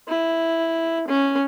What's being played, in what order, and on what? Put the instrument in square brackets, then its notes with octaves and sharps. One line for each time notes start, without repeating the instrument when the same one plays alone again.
[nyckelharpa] E4
C#4